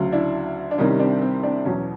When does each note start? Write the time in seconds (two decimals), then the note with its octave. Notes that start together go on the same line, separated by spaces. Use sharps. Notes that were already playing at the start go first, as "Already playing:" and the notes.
Already playing: D2 C#3 F#3
0.12 D4 E4
0.71 D4
0.78 C2 C3 D#3 G3 C#4 D#4
1.00 C4 D4
1.22 C4
1.43 C4 D4
1.65 E2 B2 F#3 C#4